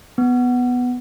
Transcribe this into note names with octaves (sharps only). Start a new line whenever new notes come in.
B3